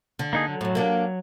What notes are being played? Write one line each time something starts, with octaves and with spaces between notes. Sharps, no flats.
D3
A#3 D#4 G#4
F#3
F#2 A2
A#3 D4 G4